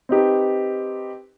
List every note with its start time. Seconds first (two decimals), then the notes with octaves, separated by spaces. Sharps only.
0.09 C4 D#4 G4 B4